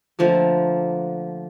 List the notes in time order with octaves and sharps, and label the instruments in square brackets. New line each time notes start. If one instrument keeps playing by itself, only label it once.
[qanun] D3 F3 A3 A#3